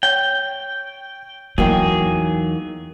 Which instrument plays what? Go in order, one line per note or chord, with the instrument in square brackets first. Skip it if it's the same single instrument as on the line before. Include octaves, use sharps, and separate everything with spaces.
[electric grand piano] C#5 [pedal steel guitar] G5
[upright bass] E2 E3 [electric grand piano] F#3 [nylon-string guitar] A#3 D#4 G5 [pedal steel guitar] G#4